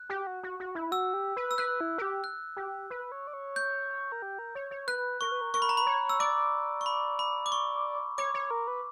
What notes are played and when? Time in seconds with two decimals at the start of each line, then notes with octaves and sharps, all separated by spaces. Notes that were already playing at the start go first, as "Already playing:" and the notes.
Already playing: F#6
0.10 G4
0.27 F#4
0.43 F#4
0.60 F#4
0.75 E4
0.92 F#4 E6
1.14 G4
1.37 B4
1.51 E6
1.58 B4 F#6
1.81 E4
1.98 A#4
2.02 G4
2.24 F#6
2.57 G4
2.90 B4
3.12 C#5
3.27 D5
3.33 C#5
3.56 G6
4.12 A#4
4.22 G4
4.39 A#4
4.55 C#5
4.71 C#5
4.87 B4 F#6
5.21 A#4 C#6
5.32 B4
5.41 A#4
5.54 A#4 C#6
5.62 B5
5.69 A#5
5.77 B4 B5
5.86 C#5
6.09 E6
6.19 D5 D6
6.81 C#6
6.86 B5
7.19 B5
7.46 D6
7.52 C#6
8.18 C#5 D6
8.34 C#5
8.51 A#4
8.67 B4